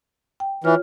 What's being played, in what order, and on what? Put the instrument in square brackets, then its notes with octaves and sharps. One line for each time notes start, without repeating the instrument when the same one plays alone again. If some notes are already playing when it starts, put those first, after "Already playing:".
[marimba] G5
[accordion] E3 [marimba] F4 C#5 F6